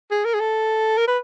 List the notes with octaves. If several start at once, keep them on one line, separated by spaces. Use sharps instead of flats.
G#4
A#4
G#4
A4
A#4
B4